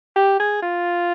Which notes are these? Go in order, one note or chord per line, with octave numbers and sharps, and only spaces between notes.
G4
G#4
F4